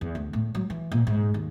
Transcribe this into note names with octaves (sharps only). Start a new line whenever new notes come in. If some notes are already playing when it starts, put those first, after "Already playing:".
E2
D2
A2
F#3
E3
A#2
G#2
D#2